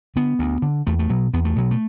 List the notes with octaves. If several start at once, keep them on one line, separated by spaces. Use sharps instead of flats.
D3 B3
D2
D3
E2 A3
A3
B2 F#3
E2 B3
A3
B2 F#3
A3